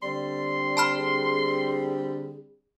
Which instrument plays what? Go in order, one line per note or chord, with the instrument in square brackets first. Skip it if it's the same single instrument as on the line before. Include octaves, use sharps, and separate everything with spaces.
[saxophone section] D3 G3 C4 [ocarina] D5 [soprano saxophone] C6
[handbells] A5 B5 F6
[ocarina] G#4